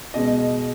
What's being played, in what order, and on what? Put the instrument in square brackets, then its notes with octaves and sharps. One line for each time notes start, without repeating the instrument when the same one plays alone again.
[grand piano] B2 G#3 B3 D#5